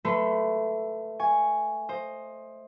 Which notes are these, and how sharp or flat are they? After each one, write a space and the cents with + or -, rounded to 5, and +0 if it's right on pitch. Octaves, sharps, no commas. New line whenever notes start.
A3 +5 B4 +0 C6 -25
G#5 +0 C#6 +5
C5 +15 D#5 +0